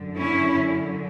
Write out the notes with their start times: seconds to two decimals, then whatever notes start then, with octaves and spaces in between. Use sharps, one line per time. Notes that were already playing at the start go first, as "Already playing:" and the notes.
Already playing: F#2 D3
0.17 C#4 E4